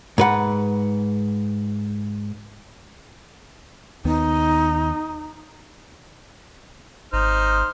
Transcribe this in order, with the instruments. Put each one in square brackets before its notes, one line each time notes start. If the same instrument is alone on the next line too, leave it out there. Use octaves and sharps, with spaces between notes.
[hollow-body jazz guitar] G#2 B4 F#5
[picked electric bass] D#2 D#3 B3 [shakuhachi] D#4
[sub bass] G#1 [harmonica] D#4 C5 F6